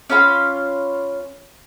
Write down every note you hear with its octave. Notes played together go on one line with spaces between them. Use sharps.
C#4 F4 F5 B5